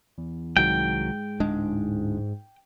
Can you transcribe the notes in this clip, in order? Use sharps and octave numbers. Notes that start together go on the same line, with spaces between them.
E2
C2 G#2 D#3 F#3 G5
D1 G#3 D4